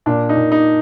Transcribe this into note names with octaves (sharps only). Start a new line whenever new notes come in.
A#2 D4
D#4
A#2
D#4